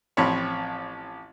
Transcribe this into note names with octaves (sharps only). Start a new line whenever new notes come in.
A1 F3 C4 F4 C#5 B5